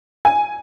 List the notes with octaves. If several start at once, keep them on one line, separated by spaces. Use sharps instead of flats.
G#5